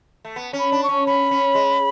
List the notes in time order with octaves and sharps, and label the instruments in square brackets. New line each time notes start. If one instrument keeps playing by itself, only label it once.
[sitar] A3
B3
C#4
[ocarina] B5
[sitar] D4
[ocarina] C#6
[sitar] C#4
[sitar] C#4 [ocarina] B5
[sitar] C#4
G#3